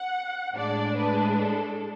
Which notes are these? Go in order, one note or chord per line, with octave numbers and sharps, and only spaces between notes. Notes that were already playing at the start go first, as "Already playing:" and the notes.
Already playing: F#5
A2 G#3 D4 D5
B4
A4